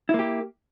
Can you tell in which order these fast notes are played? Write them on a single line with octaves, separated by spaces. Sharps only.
E4 A#3 G4